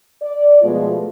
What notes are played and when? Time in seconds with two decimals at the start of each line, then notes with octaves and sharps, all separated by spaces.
0.22 D5
0.62 B2 F3 G#3 A3 B3 F4